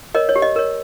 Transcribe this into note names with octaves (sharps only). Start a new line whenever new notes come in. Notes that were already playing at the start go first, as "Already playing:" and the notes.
A#4 C#5 D#5
C#5
G4
D#5
A#4 C#5